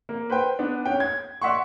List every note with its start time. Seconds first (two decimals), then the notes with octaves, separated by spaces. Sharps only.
0.09 A#3
0.30 B4 C5 G5
0.59 B3 D4
0.86 C#4 G5
1.00 G#6
1.42 D5 E5 F#5 C6 C#6